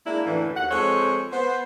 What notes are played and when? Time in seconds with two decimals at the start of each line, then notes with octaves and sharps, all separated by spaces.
0.05 G#3 A#3 D4 E4
0.26 F#2 A2 D3 E3
0.56 D#2 F#5
0.70 F2 G#3 A4 C5 C#5
1.32 B3 C5